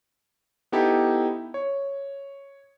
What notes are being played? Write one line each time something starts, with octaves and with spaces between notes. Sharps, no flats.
B3 D#4 E4 G4 A4
C#5